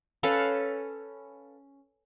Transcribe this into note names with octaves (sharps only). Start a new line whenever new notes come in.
C#4 A4 B4 F5